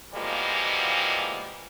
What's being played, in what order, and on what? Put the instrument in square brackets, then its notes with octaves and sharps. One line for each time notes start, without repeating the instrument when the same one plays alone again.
[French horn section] B2 E3 F3 G3 G#3 A#3